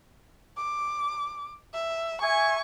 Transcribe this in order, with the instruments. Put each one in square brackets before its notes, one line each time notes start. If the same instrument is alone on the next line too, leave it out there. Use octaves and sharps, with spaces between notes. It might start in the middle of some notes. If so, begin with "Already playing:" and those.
[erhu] D6
E5
[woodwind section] E5 G#5 [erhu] C#6